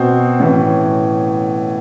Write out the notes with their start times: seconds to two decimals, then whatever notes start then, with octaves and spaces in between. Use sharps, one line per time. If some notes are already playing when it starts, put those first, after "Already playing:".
Already playing: B2 C4
0.39 A2 E3 C#4